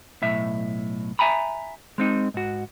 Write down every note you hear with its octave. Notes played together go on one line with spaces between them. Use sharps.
B1 A2 E5
E5 G#5 A#5 B5
G#3 C4 D#4
G#2 F#4